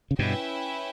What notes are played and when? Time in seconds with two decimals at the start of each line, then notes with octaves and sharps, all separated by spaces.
0.11 C#3
0.19 G2 B2 C#4 E4 B4 E5 G5